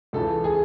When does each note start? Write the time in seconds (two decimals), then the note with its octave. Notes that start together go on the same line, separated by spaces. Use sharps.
0.13 C#2 C#3 E3 A4
0.44 G#4